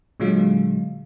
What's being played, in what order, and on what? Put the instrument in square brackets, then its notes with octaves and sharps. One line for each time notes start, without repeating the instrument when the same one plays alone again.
[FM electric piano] A#2 D3 F#3 G#3 F4